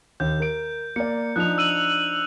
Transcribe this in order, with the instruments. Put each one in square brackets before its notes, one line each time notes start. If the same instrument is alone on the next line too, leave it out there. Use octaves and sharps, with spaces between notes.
[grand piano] D#2 [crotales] G6
[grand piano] A#4 D7
[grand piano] A#3 D5 [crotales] C#7
[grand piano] F3 D4 D#4 [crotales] F#6 F7
[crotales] E6 D#7 F#7